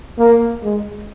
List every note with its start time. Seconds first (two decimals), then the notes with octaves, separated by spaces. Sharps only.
0.18 A#3
0.63 G#3